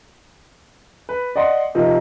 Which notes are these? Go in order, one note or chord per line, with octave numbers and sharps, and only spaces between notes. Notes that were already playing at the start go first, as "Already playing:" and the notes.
B4
D5 D#5 F#5 C6
C3 F3 D#4 F4 A#4